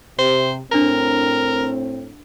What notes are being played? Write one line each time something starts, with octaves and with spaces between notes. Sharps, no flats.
C3 C5
A2 C4 D4 A#4 A#5